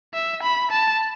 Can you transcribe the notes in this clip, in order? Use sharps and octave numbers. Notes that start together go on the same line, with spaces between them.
E5
B5
A5